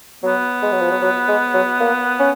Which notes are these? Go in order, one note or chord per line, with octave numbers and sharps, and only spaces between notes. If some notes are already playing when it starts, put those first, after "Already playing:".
F#3 B3
G#3
F#3
F3
F#3
F#3
G#3
F#3
A#3
C#4